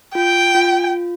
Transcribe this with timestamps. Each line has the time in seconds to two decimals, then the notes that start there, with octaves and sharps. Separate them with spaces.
0.15 F4 G5
0.55 F4